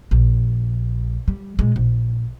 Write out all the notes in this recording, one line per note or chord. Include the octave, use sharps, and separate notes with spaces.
A#1
G3
A#2 G#3
A#1